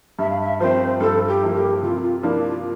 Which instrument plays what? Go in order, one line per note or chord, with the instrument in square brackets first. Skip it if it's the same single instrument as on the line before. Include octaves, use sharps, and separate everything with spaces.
[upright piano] G2 [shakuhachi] E5
[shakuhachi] F5
E5
[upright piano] F3 C4 [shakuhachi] C5
[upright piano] G2 [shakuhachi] A4
[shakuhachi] G4
[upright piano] F3 A#3 E4 A#4
[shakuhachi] G4
[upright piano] C3 [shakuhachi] F4
[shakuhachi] F4
[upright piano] F3 A#3 D4 [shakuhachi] E4
[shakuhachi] F4